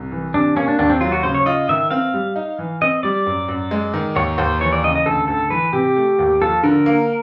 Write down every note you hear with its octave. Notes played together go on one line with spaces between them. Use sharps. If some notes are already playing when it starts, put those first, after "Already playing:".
Already playing: C2
E3
C3 D4
A#3 C#4
D4
D#2 D4
C4
F#3 F4
F#4
C#3 C5
C#5
F4 D#5
D#3 E5
C4 F5
G3
D#4
E3
C4 D#5
G3 D5
F#2
F#2
G#3
D#3
D#2 C#5
D#2 C5
E3 C#5
D5
C#3 D#5
D#5
D2 A4
D2 A4
E3 B4
C3 G4
A3
D#2
F3 A4
D3 A#4
A#3